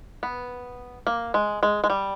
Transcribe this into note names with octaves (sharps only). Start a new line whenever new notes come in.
B3
A#3
G#3
G#3
G#3
G3